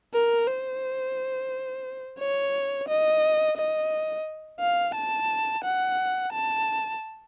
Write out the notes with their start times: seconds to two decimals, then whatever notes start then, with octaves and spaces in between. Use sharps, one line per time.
0.14 A#4
0.47 C5
2.20 C#5
2.88 D#5
3.57 D#5
4.60 F5
4.95 A5
5.64 F#5
6.32 A5